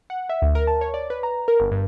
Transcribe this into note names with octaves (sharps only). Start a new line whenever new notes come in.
F#5
E5
D2
A#4
A5
C#5
D5
B4
A#5
A#4
G1
G2